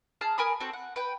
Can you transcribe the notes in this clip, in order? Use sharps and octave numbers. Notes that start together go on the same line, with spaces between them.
G#4 A5 A#5 F6
A#4 G#5 B5 D#6
C4 F#4 A4
F#5
B4 G5